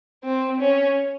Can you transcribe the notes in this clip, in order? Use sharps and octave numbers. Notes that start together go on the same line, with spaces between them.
C4
C#4